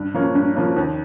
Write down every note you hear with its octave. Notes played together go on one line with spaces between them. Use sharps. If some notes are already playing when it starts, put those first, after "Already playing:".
Already playing: G2
F3 A#3 C#4
G2
F3 A#3 C#4
D#2